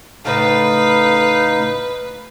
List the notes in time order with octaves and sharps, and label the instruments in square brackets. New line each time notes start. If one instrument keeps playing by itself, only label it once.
[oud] A2 C#3 A3 [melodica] D#4 F5 [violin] B4